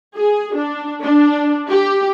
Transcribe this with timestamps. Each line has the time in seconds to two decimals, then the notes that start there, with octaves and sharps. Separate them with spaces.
0.16 G#4
0.55 D4
1.03 D4
1.69 G4